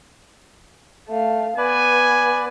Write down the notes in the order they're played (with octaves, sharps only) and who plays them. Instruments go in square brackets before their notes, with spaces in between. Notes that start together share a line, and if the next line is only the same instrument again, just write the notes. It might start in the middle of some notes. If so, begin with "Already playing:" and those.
[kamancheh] A3 F5
[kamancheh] B3 [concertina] B4 D5 [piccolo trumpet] G#5